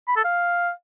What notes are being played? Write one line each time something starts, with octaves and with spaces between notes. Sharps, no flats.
B5
A4
F5